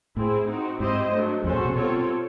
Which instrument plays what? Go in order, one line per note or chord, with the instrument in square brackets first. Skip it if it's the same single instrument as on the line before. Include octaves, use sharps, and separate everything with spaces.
[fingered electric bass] A2 [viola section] C4 E4 G#4
[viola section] C4 D#4 F#4
[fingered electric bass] G#2 [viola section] C4 E4 G4 C5 D#5
[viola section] F#3 A3 D4
[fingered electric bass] F2 [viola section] G#3 C#4 F#4 A4 C5
[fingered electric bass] A#2
B2
[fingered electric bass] B2 [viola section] G3 C4 F4 A4 C#5